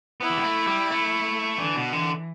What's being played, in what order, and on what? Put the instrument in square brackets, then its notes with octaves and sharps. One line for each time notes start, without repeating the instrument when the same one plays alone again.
[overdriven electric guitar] B3 [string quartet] E4
[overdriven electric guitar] E3
G3
A3
G3
A3
[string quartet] D3 [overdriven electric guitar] E3
[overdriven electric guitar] B2
[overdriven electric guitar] D3 [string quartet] E3